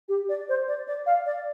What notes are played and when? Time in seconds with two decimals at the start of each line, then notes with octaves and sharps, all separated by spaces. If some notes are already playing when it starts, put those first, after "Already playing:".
0.09 G4
0.29 D5
0.49 C5
0.68 D5
0.87 D5
1.06 F5
1.26 D5